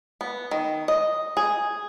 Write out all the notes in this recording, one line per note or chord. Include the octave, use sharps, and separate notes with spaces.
B3
D#3
D#5
G#4